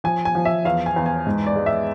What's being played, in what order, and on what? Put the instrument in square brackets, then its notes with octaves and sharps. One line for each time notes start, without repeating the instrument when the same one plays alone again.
[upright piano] F3 G#5
G#5
F3
E5
E2 F5
G#5
E2
G#5
G#2
D5
G#3
E5